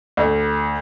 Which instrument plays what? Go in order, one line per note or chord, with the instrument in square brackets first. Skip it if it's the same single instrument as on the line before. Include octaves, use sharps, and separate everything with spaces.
[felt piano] D2